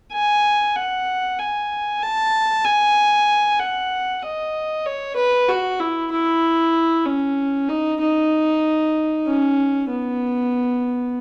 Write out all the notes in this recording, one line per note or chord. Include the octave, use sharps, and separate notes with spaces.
G#5
F#5
G#5
A5
G#5
F#5
D#5
C#5
B4
F#4
E4
E4
C#4
D#4
D#4
C#4
B3